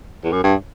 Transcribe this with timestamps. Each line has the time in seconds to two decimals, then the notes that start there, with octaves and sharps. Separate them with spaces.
0.24 E2
0.32 F#2
0.44 G2